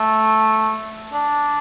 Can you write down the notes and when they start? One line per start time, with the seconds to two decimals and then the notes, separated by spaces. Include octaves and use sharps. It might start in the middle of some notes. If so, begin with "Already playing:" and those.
Already playing: A3
1.13 D4